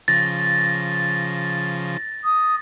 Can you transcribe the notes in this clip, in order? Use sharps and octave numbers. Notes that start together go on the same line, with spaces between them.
C#3 F3 A6 A#6
D#6